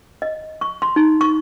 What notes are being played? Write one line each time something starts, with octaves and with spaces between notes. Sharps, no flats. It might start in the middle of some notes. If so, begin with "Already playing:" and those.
D#5
C#6
C6
D#4
C#6